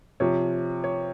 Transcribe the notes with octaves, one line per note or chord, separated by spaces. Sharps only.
C3 F3 C#5
C#5